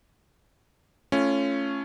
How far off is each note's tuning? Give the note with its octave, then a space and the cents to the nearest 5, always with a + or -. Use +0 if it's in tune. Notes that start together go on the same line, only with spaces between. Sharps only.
A3 +0 C#4 +0 F4 -30